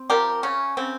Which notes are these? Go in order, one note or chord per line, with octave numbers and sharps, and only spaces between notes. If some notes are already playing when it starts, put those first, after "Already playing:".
Already playing: C4
F3 G4 A#4
C#3 C#4
C#3 C4